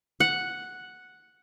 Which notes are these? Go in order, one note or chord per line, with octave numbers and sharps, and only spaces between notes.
F#5